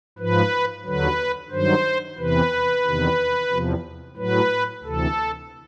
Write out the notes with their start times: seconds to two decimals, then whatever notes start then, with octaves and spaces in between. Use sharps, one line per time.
0.18 G#2 F3 B4
0.85 D#2 D3 F#3 B4
1.51 G2 D#3 F#3 C5
2.18 E2 C3 E3 B4
2.85 E2 C3 D#3
3.51 E2 C3 F3
4.17 A2 F#3 B4
4.84 D2 C3 E3 A4